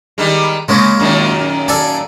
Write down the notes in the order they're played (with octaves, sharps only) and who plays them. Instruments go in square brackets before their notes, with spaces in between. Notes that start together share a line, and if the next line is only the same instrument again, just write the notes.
[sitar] D#3 G3 G#3
[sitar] C#3 [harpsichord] G#3 A#3 C#4
[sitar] F#2 A#2 D#3
[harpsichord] A4 D5 G#5